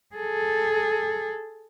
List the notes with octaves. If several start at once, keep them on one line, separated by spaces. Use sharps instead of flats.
G#4 A4